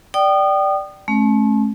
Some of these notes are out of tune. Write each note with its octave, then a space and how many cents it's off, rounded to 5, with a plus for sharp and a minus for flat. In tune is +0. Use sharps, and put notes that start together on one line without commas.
D5 +0 G5 -20 D#6 -30
A3 -35 C#4 -40